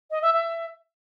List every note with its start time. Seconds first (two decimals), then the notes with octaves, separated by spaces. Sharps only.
0.11 D#5
0.22 E5
0.33 E5